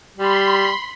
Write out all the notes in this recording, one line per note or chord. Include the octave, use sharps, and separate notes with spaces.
G3 B5 C6